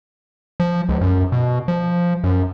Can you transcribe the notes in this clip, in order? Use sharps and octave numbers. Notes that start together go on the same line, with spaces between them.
F3
C#2
F#2
B2
F3
F#2